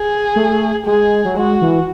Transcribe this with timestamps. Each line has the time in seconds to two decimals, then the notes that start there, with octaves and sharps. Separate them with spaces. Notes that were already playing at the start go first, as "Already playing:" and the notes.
Already playing: G#4
0.36 A3
0.85 G#3 G#4
1.25 F#3
1.37 G#3 F#4
1.61 E3